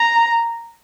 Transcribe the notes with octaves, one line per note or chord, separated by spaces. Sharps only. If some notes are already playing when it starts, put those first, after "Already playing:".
Already playing: A#5